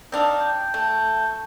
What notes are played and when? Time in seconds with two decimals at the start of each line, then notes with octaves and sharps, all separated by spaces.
0.12 C4 D4 D#4 F5
0.40 G5
0.74 A3